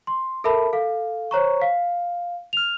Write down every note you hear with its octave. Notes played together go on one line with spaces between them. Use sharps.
C6
A4 A#4 E5 A5 B5
A4 F5
C5 C#5 A#5 C#6
F5
F6 F7